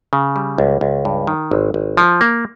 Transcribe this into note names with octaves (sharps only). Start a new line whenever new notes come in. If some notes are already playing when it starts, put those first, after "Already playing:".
C#3
G3
C#2
C#2
G2
D#3
G#1
G#1
F3
A#3